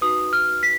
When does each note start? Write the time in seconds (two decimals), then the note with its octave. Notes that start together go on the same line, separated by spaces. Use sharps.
0.01 D#4 F#4 B4 D#6
0.33 F6
0.63 B6